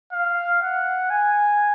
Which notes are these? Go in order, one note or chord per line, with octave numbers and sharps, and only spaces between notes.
F5
F#5
G#5